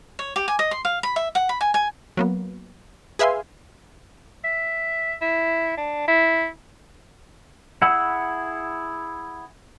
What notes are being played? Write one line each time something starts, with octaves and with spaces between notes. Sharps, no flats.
C#5
G4
G#5
D#5
C6
F5
B5
E5
F#5
B5
G#5
G#5
F#3 A#3 B3
G#4 B4 E5 F5 G#5 C6
E5
E4
D4
E4
E4 G#4 F#5 B5 E6